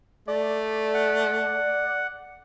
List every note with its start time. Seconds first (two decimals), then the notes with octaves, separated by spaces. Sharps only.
0.28 A3 D5
0.94 F#5